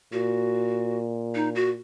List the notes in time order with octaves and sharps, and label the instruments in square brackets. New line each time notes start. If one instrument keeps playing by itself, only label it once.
[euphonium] A#2 [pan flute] F#4
[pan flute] D#4
F#4